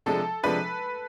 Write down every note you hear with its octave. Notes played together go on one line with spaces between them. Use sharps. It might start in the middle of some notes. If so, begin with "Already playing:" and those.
C3 F3 G#3 D4 A4
C3 F3 G#3 D4 B4